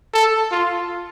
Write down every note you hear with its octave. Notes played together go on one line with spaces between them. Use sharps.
A4
F4